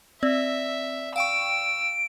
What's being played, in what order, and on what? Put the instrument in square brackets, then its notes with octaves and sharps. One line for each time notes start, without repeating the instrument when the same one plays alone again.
[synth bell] C4 [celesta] D5 [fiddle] E5
[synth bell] F5 G5 C#6 [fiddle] E6 [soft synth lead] D7